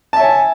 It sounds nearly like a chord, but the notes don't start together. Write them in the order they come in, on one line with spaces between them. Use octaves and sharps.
A5 E5 C#5 G#5